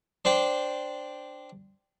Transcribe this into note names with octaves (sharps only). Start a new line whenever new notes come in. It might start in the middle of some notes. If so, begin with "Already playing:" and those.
D4 C5 D5 G5